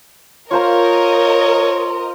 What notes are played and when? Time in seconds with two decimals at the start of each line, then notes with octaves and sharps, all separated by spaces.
0.51 F4 A#4 C5 C#5 D#5 A#5